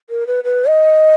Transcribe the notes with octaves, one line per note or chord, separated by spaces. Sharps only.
A#4
B4
B4
D#5